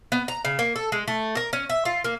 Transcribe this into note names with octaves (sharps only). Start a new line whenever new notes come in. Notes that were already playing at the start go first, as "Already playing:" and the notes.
B3
A#5
C#3
A#3
A4
G#3
A3
A#4
C#4
E5
F4
A#3